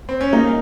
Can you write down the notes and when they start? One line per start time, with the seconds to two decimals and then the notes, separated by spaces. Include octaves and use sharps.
0.09 C4
0.21 C#4
0.33 A#3 D#4